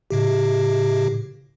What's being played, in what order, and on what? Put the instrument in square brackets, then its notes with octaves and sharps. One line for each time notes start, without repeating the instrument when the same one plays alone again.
[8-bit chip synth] A2 C#3 G4